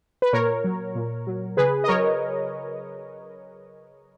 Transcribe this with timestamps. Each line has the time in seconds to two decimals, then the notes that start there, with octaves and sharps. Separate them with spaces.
0.22 B4
0.33 A#2 A#4 C#5
0.64 F#3
0.95 A#2
1.27 F#3
1.57 C#3 G#4 B4
1.84 D#5
1.88 F#3 A#4 C#5